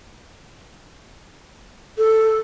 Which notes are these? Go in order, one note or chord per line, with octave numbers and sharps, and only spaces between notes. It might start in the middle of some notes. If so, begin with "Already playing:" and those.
A4